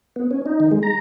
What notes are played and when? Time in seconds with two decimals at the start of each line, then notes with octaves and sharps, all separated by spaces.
0.16 B3
0.31 C#4
0.46 D#4
0.60 D#3
0.72 G#3
0.83 A#5